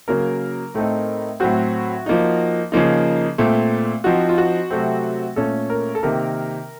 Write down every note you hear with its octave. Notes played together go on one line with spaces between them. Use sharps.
C#3 F#3 A#3 A#4
A2 A3 C4 D#4
A2 F#3 C4 F#4
F3 A#3 D#4
C#3 F3 A#3 D#4
A#2 A3 C4
F3 C4 D#4 F#4
F4
F#4
C3 F#3 A3 C4
A#2 A3 C#4 A4
A#4
A4
C3 D#3 A#3 A#4